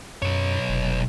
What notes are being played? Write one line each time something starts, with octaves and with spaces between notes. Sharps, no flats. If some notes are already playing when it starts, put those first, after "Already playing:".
B1 F#2 C#5
F1